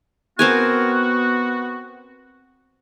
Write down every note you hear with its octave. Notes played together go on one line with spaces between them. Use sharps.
B3 C4 F#4 A#4 G#5